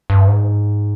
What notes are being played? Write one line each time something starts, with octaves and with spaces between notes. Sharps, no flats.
G2
G#2